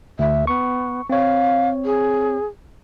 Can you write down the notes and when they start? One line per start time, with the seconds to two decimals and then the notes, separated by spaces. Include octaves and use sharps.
0.19 D2 E5
0.47 B3 C#6
1.10 C4 C#5 F5
1.85 G#4